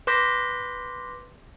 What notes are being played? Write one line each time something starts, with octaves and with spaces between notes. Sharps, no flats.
B4 C6 D6 G6 A#6 B6